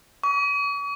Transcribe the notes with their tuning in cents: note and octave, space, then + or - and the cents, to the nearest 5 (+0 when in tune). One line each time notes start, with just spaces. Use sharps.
C#6 +45